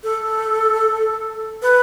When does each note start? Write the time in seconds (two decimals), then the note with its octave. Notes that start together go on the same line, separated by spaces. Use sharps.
0.04 A4
1.62 B4